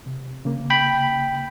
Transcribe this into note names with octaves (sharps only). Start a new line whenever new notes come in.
C3
C#3 A#3
G5 B5